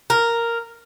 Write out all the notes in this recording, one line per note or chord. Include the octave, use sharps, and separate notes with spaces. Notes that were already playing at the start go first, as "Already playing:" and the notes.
A#4